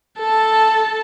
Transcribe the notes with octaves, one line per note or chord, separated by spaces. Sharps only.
A4 A5